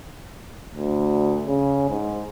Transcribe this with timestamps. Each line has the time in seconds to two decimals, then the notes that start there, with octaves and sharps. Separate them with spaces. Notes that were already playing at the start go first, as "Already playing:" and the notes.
0.75 D2
1.47 C#3
1.90 G#2